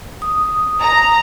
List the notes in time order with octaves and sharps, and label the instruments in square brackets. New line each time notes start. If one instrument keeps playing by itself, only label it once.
[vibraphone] D#6
[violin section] A#5